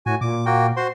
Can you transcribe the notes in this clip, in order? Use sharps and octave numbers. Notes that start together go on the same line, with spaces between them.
A2 F#4 G#5
A#2 D6
A#3 F#4 G5
F#4 C5 C6